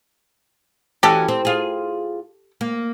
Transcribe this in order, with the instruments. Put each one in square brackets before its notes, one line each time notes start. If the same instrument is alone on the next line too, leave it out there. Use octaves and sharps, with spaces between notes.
[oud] E3 C#4 F#4 [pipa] G4 A4
[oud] C4
F4 G#4
A#3